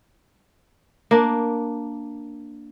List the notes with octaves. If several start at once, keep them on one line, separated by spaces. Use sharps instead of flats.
A#3 D4